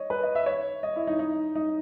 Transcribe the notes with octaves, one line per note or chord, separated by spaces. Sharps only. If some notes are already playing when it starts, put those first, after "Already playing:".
Already playing: C#5 D#5
B4
D#5
E5
C#5
D#5
E4
D#4
D#4
D#4